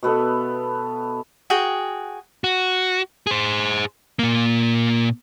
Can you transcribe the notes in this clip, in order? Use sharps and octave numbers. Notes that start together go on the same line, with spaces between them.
B2 B3 A4 E5
F#4 G#4 G5
F#4
G#4 C5
A#2 A#3